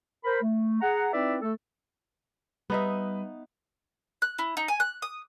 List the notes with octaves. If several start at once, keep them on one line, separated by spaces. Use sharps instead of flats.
A#4 C5 B5
A3
G#4 F#5 A#5
C4 D#4 E4 B4 D5 E5
A3 A4
G3 B3 D#4 B4 E5
F#6
E4
D#4
G#5
F#6
D#6